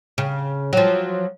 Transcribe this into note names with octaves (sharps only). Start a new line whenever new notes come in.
C#3
F3 F#3